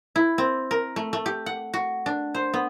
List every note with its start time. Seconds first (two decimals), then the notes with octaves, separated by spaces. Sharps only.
0.16 E4
0.38 C4
0.71 A#4
0.96 A3
1.13 A3
1.26 G4
1.46 F#5
1.74 F#4
2.06 D4
2.34 C5
2.54 B3